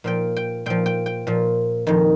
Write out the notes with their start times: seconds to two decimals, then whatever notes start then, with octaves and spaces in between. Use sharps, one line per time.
0.04 A#2 F3 G5
0.36 G5
0.66 A#2 F3 G5
0.86 G5
1.06 G5
1.27 A#2 F3
1.87 F2 D#3